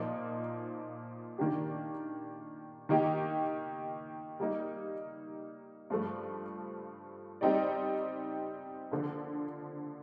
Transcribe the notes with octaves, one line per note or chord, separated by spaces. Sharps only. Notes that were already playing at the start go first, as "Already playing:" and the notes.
Already playing: A#2 F3 A#3 D#4
D#3 A#3 D4 G4
D#3 A#3 D#4 G4
G3 A#3 D#4
G2 F3 A3
G3 C4 D#4 G4 D5
D3 F3 A#3